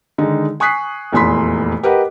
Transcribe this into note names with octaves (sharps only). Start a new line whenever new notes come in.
D3 D#3 G#3 D#4
G#5 C#6 D#6 F#6 B6 C7
F1 E2 A#2 B5 C6 B6
G4 A#4 B4 D#5 F#5